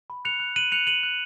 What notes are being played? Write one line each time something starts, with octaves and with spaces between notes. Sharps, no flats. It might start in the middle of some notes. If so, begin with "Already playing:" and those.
B5
F#6 C#7 F7
F#6
F#6 D#7 F#7
F#6 C#7 F7
F#6 D#7 F#7
F#6